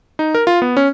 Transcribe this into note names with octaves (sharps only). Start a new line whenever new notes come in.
D#4
A#4
F4
B3
C#4